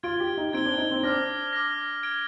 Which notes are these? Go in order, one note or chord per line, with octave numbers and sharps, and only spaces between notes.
F4 G#6 D7 G7
G4
D#4
C4 G#6 D7 G7
D4
D#4
C4
D4 D6 F6 A#6
D6 F6 A#6
G#6 D7 G7